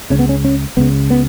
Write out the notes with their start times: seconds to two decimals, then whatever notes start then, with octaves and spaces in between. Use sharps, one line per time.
0.10 C#2 C#3 C#4
0.19 B3
0.29 C#4
0.44 C#4
0.77 C#2 C#3 B3
1.10 B3